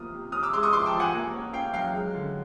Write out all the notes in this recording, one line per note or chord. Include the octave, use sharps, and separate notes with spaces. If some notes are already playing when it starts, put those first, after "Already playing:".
Already playing: F3 A#3 B3 D#6 F6
C3
C#4 D#6 F6
D6 E6
G#3 C6 D6
C#6 D#6
F3 C6 D6
G5 A5
F3
F#5 G#5
A#3
C#4
C#4 F5 G5
F#3 F5 G5
G#3
D3